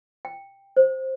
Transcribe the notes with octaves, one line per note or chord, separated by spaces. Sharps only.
G5
C5